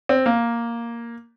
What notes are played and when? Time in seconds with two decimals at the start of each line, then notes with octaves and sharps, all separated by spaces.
0.09 C4
0.26 A#3